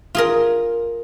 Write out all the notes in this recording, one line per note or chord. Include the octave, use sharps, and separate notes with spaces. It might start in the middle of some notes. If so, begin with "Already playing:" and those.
F4 G#4 A#4